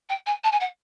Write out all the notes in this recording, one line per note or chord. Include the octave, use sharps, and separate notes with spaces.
G5
G#5
A5
G#5
F#5